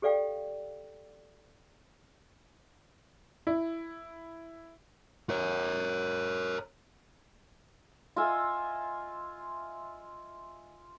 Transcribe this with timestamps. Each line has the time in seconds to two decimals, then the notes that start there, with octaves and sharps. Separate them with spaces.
0.02 G4 A4 D5 F5 G5
3.47 E4
5.30 A#4 C#5
8.16 F4 D#5 E5 G#5